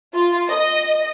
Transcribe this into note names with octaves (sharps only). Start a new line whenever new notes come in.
F4
D#5